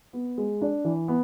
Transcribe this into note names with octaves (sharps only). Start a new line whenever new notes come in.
B3
G#3
D4
E3
B3